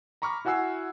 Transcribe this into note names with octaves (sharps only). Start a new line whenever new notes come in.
A#5 B5 C#6 D6 F6
E4 F#4 F#5 G#5 E6 C7